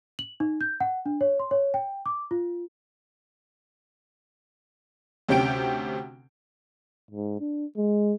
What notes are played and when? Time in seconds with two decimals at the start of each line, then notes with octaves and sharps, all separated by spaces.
0.19 F#7
0.40 D#4
0.61 G6
0.80 F#5
1.06 D4
1.21 C#5
1.39 C6
1.51 C#5
1.74 G5
2.06 D6
2.31 F4
5.28 D2 C3 C#4 G4 G5 D7
7.11 G#2
7.40 D4
7.77 G#3